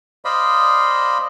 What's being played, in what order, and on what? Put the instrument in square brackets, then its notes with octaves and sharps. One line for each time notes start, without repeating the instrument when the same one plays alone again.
[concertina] C5 D5 D#5 F5 B5